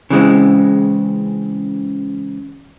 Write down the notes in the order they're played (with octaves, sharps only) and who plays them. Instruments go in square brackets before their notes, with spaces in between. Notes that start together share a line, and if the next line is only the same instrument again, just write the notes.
[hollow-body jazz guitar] C#3 E3 G#3 C4